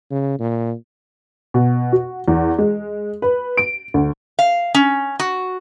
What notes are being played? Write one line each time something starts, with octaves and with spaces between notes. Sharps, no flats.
C#3
A#2
B2
F#4
E2
G#3
B4
D7
D2
F5
C#4
F#4